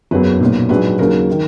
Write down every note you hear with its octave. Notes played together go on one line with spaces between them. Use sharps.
F#1 E2 C#3 F#3 B4
B1 A#2 F#3
A#1 G#2 F#3 B4
D#2 C#3 F#3 A#4
D#3